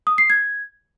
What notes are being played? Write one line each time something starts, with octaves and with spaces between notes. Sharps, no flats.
D#6
C7
G#6